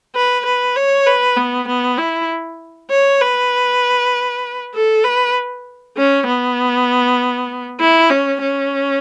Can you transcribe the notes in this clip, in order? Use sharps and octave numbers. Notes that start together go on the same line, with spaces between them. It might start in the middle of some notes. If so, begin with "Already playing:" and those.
B4
B4
C#5
B4
B3
B3
E4
C#5
B4
A4
B4
C#4
B3
E4
C#4
C#4